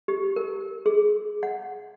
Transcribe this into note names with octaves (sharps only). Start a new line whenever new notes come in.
G4
A#4
G#4
F#5